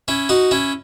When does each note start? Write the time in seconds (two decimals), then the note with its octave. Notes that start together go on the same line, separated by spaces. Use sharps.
0.08 C#4 E4
0.29 D#4 F#4
0.51 C#4 E4